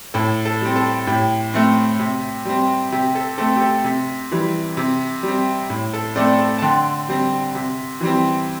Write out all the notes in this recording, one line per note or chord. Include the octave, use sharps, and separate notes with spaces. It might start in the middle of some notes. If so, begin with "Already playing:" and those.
A2 A4
A4
G3 C4
A4
A2 G4
A3 C4
C3
G3 C4
C3 G4
A4
A3 C4 A4
G4
A4
C3
E3 G3
C3
G3
C4
A2
A4
A3 C4 A4 D5
A4
A5
D3 G5 C6
G3 C4
C3
E3 G3 C4